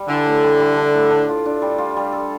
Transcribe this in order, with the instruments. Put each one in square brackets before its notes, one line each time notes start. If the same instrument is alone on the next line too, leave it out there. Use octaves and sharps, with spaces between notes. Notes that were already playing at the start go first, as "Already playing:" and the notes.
Already playing: [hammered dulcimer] G3
[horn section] D3 [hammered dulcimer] E3
[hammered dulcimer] A2
G3
G3
D4
A2
D4
F4
D4
G3
F4
G3
A4